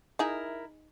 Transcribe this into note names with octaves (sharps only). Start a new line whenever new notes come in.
D#4 E4 G#4 A#4